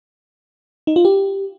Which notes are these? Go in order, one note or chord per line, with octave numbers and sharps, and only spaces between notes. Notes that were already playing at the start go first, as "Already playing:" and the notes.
D#4
F4
G4